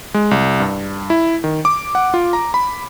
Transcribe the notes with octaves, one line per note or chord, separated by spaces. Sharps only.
G#3
C2
G2
E4
D#3
D6
F#5
F4
A#5
B5